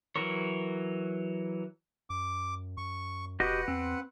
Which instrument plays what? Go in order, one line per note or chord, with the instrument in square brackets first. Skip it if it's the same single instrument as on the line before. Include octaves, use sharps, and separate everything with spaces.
[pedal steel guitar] E3 F#3 A#4 C#5
[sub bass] F#2 [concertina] D6
[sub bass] F#2 [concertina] C#6
[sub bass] E1 [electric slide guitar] F#4 G4 D#5 [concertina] B4 F#5
[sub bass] E2 [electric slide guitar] C4